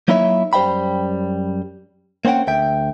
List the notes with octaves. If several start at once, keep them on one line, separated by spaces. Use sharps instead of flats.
F#3 A#3 D#4 E4 C#5 E5
F#2 G3 C5 E5 G5 B5
A#3 C4 C#4 F#5 G5
D2 E5 G5